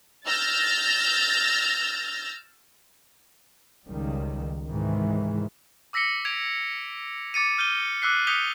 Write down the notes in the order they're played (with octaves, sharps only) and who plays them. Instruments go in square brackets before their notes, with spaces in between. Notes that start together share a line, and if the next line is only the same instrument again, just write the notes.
[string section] E6 F6 G6 A6 A#6
[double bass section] C#2 D#3 G3
G#2 C3 D#3 E3 G#3
[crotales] D6 E6 A#6 B6 C#7 G7
G#6 B6 D7 F7
D6 A6 C#7 D#7
F6 G6 D#7 G7
D6 E6 F#6 B6 C7
D#6 G6 B6 C#7 F7 G7